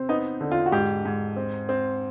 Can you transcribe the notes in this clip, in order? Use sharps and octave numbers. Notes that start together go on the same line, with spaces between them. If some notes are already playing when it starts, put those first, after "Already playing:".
Already playing: C3 C4
B3 D#4
D3
F4
F#4
G#2 G4
G#2
C4
C4